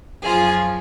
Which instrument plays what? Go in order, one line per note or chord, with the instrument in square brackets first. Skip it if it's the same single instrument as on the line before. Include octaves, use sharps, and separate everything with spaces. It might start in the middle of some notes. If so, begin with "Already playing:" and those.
[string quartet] F#2 F3 F4 G#4